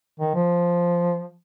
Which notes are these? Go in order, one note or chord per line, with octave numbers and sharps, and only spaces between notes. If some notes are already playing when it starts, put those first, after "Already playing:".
D#3
F3